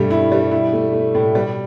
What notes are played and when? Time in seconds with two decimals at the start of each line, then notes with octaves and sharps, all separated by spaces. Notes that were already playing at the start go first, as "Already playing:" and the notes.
Already playing: G2 B2 G3 A3
0.10 E4
0.32 G3
0.51 E4
0.73 A3
0.93 A3
1.15 A2
1.35 G3